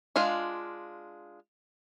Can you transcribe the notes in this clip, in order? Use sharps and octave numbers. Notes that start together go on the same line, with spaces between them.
G#3 D4 F4 F5